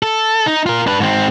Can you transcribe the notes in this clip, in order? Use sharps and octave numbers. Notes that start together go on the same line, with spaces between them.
A4
D#4
F4 A#4
D4 B4
G#2 C4